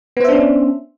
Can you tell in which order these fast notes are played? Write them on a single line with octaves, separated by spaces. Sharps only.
B3 C5 E5 D4 C#4